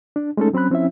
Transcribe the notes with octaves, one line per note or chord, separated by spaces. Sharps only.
D4
G#3 A3 C#4 D#4 A4
F#3 C4 C#4 B5 F#6
F3 C4 C#4 E4 E5